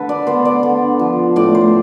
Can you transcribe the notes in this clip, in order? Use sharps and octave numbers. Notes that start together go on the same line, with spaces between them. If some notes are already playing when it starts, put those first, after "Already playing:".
Already playing: D3 A4 B4
D5
B3 C5
D5
D3
F3
A2 D5
C5